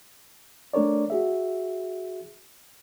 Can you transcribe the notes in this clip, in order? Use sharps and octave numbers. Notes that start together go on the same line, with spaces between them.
A3 D4 A#4 C#5 D5
F#4 G#4 E5